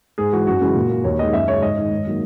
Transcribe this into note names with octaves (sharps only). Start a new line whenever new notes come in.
G#2 G#4
E3 G#3 F#4
F#2 F#4
C#3 E3 G#3
A#2
A#3
D#2 C#5
D#3 G#3 D#5
F#2 E5
C#3 G#3 C#5
G#2 D#5
D#3 G#3
G#2
D#3 F#3 A#3